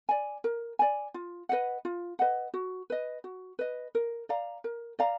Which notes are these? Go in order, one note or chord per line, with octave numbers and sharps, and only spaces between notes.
D5 G#5
A#4
D5 G#5
F4
B4 D#5 F#5
F4
B4 D#5 F#5
F#4
B4 D#5
F#4
B4 D#5
A#4
D5 F5 A#5
A#4
D5 F5 A#5